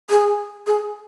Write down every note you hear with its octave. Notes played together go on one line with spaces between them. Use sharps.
G#4
G#4